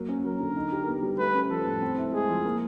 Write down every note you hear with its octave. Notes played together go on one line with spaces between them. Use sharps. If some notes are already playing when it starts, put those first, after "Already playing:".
Already playing: F#3 A#3
C#4
F#3 A#4
D3
D#4
G4
B3
G3
A3 B4
C#4
F3 A4
A2
C4
E4
G#3 G#4
F3
A#3